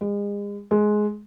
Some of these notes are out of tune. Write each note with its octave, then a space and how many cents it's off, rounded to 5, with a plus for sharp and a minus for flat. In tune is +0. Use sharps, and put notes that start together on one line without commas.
G#3 -35
G#3 +15